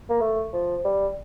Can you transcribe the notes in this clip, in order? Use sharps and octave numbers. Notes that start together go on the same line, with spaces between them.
A#3
A3
F3
G3